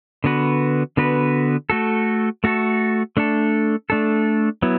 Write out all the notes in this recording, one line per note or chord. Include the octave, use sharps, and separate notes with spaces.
D3 B3 F#4 B4
D3 B3 F#4 B4
A3 F#4 A4
A3 F#4 A4
A3 D4 A4
A3 D4 A4
F#3 B3 E4